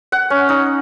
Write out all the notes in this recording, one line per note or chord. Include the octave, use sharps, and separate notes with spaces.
F#5
C#4
D#4